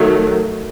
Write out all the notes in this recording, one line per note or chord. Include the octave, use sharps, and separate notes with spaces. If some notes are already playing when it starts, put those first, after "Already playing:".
Already playing: D#3 F#3 A3